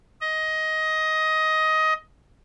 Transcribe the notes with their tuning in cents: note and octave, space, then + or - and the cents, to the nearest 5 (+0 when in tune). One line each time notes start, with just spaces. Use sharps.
D#5 +15